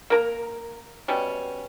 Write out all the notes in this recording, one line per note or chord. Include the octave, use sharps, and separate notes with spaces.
A#3 A#4 A#5
B2 G3 C#4